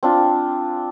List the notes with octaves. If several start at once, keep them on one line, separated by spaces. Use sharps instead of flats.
C4 D4 F4